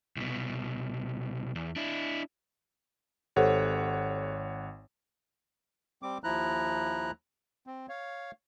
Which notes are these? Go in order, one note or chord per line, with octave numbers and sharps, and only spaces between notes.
C2 B2
E2
D4 E4
G#1 G4 A4 C5 C#5 F#5
G3 C4 D6
D#2 F3 E4 A#5 F#6
C4
C#5 F5